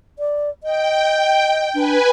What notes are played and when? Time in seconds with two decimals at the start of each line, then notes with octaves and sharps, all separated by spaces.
0.19 D5
0.63 D#5 G5
1.74 D4 B4 G#5